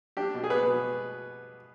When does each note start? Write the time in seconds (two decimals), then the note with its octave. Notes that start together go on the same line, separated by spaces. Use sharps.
0.17 D4 G4
0.34 B2
0.44 G#4
0.50 B3 B4
0.67 B2